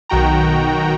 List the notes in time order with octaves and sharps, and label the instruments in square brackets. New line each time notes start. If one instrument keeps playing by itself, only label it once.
[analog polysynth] B1 D#3 F#4 G5 A#5